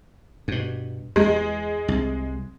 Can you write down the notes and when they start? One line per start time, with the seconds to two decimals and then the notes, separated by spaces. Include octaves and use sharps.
0.48 G2 B2
1.16 E2 G#3
1.88 C2